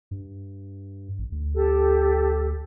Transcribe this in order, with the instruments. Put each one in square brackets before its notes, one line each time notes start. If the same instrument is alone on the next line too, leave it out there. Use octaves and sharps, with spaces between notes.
[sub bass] G2
A1
D2
[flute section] G4 A4